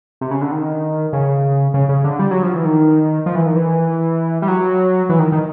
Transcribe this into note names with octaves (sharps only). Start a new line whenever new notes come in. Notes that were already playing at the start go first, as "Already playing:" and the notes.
C3
C#3
D3
D#3
C#3
C#3
C#3
D3
G3
F#3
F3
E3
D#3
F3
E3
D#3
E3
G3
F#3
E3
D#3
D#3